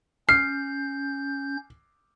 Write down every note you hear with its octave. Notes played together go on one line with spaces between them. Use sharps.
C#4 F6 G6 C7